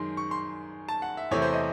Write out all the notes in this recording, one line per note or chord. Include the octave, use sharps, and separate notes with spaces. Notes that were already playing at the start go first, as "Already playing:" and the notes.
Already playing: F#2 D#3 G#3 C6
C#6
C6
A5
F#5
E5
E2 C3 E3 A3 C#5
C5
D#5